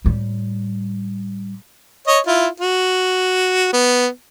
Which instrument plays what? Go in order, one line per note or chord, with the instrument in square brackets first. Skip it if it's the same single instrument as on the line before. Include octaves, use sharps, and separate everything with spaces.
[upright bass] A2 G3
[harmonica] C#5 D#5
E4 F4
F#4
B3